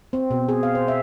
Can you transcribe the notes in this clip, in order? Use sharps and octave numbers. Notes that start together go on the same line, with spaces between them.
C4
B2
G#4
F5
C5
E5